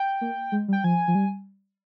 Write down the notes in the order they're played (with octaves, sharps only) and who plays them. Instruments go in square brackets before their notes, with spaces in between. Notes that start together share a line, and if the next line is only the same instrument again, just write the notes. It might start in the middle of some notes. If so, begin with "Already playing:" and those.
Already playing: [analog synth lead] G5
[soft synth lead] A#3
G#3
G3
[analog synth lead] G5
[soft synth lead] F3 [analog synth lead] G#5
[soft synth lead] F3
G3